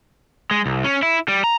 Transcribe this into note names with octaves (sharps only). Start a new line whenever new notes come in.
G#3
C2
C#4
E4
G3
A#5